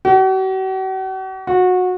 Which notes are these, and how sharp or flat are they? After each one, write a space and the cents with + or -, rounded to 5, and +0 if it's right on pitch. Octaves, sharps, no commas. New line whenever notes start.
F#4 +45
F#4 -20